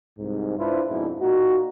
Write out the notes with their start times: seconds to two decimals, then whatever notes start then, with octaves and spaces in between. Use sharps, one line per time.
0.19 C2 G#2
0.59 D4 E4 F4 B4 C5
0.90 F2 G#2 B2 D4 E4
1.21 A#2 D#4 F#4